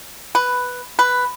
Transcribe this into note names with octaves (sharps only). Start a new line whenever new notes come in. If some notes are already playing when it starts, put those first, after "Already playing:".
B4
B4